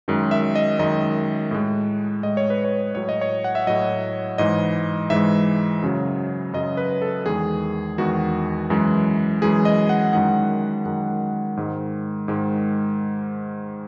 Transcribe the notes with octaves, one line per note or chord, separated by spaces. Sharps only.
F#2 D#3 G#3
E5
D#5
F#2 D#3 G#3 D#5
A2 G#3
A2 G#3 D#5
C#5
B4
C#5
A2 F#3 C#5
D#5
C#5
F#5
E5
A2 F#3 D#5
G#2 E3 G#3 D#5
G#2 E3 G#3 E5
F#2 C#3 F#3
F#2 C#3 F#3 D#5
B4
A4
E2 D#3 G#3 G#4
E2 D#3 G#3 F#4
F#2 E3 G#3
F#2 E3 G#3 G#4
D#5
F#5
F#2 D#3 G#3 F#5
F#2 D#3 G#3
G#2 D#3 G#3
G#2 D#3 G#3